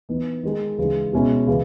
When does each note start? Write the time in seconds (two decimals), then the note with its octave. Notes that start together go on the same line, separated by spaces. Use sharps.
0.09 E3 B3 D#4
0.43 D#3 G#3 D#4
0.78 C#3 E3 G#3 D#4
1.13 B2 G#3 C#4 E4
1.47 C#3 E3